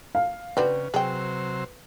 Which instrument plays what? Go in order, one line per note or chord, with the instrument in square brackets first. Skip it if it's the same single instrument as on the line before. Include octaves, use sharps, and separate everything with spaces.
[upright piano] F5
[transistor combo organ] C#3 [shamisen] C4 D4 F#4 [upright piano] B4
[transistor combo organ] C3 F#3 C5 [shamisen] G#4 G5